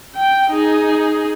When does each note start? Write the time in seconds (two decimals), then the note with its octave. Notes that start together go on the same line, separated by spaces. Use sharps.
0.15 G5
0.50 D#4 G#4